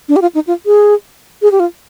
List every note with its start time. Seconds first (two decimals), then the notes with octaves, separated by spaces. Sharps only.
0.09 D4
0.16 G4
0.22 F4
0.35 D#4
0.47 F4
0.66 G#4
1.42 G#4
1.52 G4
1.60 F4